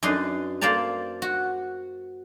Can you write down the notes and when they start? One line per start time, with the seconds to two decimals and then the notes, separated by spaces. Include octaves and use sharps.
0.03 F#2 D4 D#4 B4 C6
0.61 A#3 C5 D5 A5 A#5
1.22 F#4